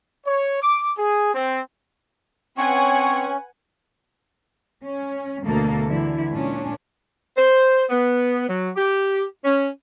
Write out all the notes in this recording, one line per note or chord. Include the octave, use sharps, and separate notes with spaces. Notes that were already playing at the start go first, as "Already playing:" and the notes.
C#5
D6
G#4
C4
C4 C#4 B4 C#5 F#5 G#5 C#6
C#4
D2 B2 A#3 A4
D3 E3 G#3 E4
A#2 C#4 D4
C5
B3
F#3
G4
C#4